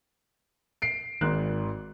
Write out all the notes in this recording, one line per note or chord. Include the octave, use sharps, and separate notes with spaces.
C7 D7
G#1 G#2 D#3 F#6